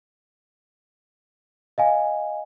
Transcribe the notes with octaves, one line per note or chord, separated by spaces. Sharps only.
D#5 F5 G#5